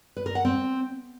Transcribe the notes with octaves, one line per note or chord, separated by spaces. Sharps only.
B4
A#4
F#5
C4